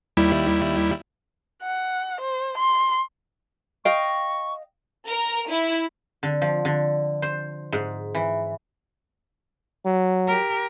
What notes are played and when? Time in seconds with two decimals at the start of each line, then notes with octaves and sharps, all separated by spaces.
0.17 D#2 G3 E4
1.63 F#5
2.21 C5
2.58 C6
3.85 D#5 F5 G5 C#6
5.07 A#4
5.50 E4
6.23 D3
6.42 F3
6.65 D3
7.22 C5
7.72 G#2
8.15 E3
9.85 F#3
10.27 G4 A#4